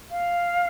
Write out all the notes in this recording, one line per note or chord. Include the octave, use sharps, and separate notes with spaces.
F5